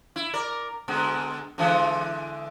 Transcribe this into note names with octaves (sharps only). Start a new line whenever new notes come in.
E4
A#4 D5
B2 D3 G#3
D3 E3 G#3